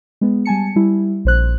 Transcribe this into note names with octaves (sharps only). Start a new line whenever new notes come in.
G#3 B3
G3 G#5 A5 C#7
G3 E4
A#1 C5 F#6